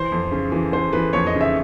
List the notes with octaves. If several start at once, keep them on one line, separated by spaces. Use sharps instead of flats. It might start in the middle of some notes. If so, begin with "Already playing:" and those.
Already playing: E3 C5
F2
C#3
E3
E3 C5
E3 B4
F2 C#5
D#5
C#3
E5